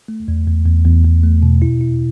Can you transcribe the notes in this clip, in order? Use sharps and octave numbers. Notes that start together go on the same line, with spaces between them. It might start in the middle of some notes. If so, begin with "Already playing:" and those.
A3
E2
E2
E2
E2
E2
A3
B2
E4
E4